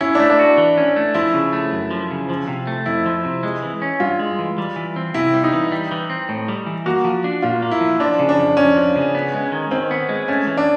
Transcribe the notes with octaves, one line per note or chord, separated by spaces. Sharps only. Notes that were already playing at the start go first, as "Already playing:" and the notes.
C#4 E4
A3 D4
D4
F#4
E3
C#4
A3
F3 E4
C#3
A3
F#2
F3
C#3
F3
C3
A3
F2 E4
F3
C3
G#3
E3
C#4
G2 F4
G#3
E3
G3
E3
C4
C3 E4
G3
D#4
E3
G3
E3
C4
A2
G3
E3
A#3 F#4
F3
D4
A#2 F4
A#3
E4
F3
F3 D4
C#3
D4
F2
F2 C#4
F3
C#3
B3
G#3
D#3
D#3 C4
B3
G#3
A3 C#4
E3
D4